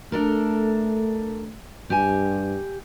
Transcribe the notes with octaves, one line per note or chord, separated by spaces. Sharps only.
A3 D4 A4 A#4
G2 G4 G#5